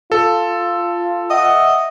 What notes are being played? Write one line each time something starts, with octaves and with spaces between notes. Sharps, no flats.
F4 A4
D#5 E5 F#5